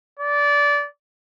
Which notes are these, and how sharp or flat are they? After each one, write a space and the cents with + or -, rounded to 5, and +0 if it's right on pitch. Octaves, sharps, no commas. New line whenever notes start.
D5 -20